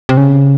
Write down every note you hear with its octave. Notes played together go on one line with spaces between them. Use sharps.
C3
C#3